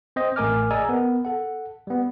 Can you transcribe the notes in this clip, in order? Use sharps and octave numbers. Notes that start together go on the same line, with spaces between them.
C4 C5 D#5
A1 A3 A#4 G#5 D6 F6
G#4 D5 D#5 G#5 A#5 E6
B3 A#4
A4 F#5
G3 B3